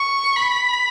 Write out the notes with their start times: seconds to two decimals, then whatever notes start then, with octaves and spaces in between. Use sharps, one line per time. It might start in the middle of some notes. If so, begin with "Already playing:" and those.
Already playing: C#6
0.36 B5